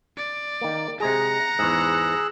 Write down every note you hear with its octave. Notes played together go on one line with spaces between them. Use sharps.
D5
D#3 A#3
C3 G#3 G#4 F#5 A#5
E2 G#2 G#4 E6 F#6